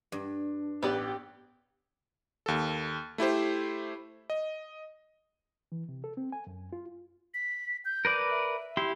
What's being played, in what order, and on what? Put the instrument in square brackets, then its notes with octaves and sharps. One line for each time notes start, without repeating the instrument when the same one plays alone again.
[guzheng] G2 [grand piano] D4
[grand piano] A1 [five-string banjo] B3 B4 D5 [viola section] G4
[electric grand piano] D#2 A4
A3 E4 G4 C5
D#5
[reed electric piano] E3
C3
A4
C4
G#5
F#2
F4
[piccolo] B6
G6
[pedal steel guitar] A#4 B4 D5
[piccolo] E5
[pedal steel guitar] E4 G4 C6